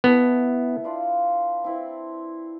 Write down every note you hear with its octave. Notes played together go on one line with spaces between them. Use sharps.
B3 E4 A4 E5
D4 F4 B4 D5
C4 E4 B4